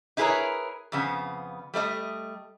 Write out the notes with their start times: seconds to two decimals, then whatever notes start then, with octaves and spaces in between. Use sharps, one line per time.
0.17 D#4 E4 G#4 A#4 B4 C#5
0.92 F2 C#3 B3
1.74 G3 A3 D5 D#5